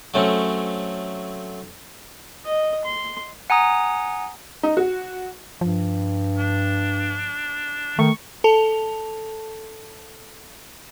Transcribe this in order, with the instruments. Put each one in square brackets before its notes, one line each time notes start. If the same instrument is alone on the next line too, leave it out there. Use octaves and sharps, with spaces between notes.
[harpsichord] F#3 A3 C4 C#4
[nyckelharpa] D#5
C6
[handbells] F#5 G#5 A#5 D#6
[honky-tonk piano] D#4
F#4
[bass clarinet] G2 [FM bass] F3
[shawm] D4
[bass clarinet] D#3 [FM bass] A3 [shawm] C#6
[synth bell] A4 A5 F7